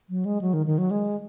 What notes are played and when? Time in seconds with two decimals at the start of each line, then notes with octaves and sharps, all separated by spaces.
0.10 F#3
0.25 G#3
0.41 F#3
0.53 D#3
0.66 D#3
0.78 F#3
0.91 G#3